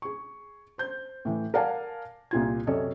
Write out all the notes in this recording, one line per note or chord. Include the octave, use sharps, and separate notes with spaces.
G#4 C#6
C5 G6
A2 E3
A#4 D5 F5 F#5 G#5 A5
C2 A#2 F4 G#6
F#2 C3 C#4 A4 D5 D#5